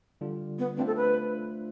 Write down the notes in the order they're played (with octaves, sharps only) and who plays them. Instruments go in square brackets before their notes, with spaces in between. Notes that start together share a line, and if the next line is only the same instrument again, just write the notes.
[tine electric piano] D3 G3 D4 F4
[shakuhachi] B3
[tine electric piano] A3 D4 F4 C5 E5 [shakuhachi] C4
[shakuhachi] A4
B4